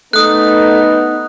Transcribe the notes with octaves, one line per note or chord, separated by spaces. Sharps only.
A3 B3 D#4 D#6 F#6